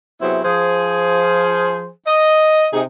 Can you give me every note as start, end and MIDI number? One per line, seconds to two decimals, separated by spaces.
0.21 0.39 48
0.21 0.39 54
0.21 0.39 59
0.21 0.39 64
0.21 0.39 68
0.21 0.39 72
0.44 1.89 53
0.44 1.89 68
0.44 1.89 72
2.06 2.67 75
2.73 2.82 48
2.73 2.82 63
2.73 2.82 68